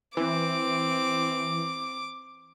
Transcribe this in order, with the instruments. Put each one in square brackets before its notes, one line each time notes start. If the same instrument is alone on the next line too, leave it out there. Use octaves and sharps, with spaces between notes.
[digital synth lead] E3 [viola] C4 [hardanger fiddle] D6